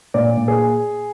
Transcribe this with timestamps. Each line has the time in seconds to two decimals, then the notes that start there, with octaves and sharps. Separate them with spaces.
0.14 A#2 D5
0.37 A#2
0.48 G#4